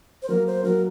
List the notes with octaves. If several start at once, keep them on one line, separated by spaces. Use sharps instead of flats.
C5
F#3 A#3 F#4 A#4
C5
F#3 A#3 F#4 A#4